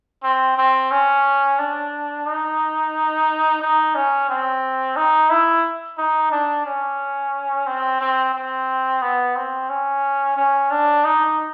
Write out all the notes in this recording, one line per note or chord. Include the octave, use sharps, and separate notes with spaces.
C4
C4
C#4
D4
D#4
D#4
C#4
C4
D#4
E4
D#4
D4
C#4
C4
C4
C4
B3
C4
C#4
C#4
D4
D#4